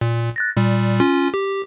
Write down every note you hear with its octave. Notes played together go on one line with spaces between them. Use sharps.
A#2
F#6 A6 A#6
A#2 G3
C#4 F4
G4